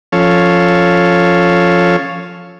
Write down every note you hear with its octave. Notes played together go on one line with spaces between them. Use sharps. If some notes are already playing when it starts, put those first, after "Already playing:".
F3 C#4 A4 C#5 F5